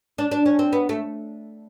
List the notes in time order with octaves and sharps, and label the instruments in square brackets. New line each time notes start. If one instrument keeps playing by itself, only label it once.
[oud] D4
D4
C#4
C4
B3
A3